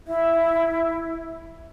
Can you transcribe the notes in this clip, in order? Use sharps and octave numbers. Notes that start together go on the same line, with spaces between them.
E4 E5